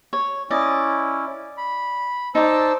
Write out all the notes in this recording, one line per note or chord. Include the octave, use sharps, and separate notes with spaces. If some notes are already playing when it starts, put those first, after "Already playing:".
C#5
C#4 E4 D5 D#5
B5
D#4 C5 D5 A5 E6